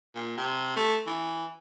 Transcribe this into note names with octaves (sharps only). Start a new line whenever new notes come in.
A#2
C3
A3
E3